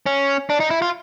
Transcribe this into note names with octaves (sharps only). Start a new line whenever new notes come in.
C#4
D4
D#4
E4
F4